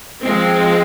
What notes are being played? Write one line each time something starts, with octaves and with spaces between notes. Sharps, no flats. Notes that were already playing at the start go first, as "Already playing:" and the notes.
F3 G#3 C4